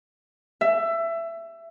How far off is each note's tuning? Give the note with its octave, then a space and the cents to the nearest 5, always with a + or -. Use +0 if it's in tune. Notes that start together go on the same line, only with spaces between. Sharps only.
E5 +20